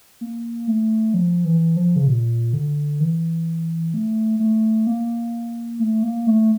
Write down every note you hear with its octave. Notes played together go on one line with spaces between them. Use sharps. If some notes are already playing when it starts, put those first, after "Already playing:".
A#3
A3
F3
E3
F3
C#3
A#2
D3
E3
A3
A3
A#3
A3
A#3
A3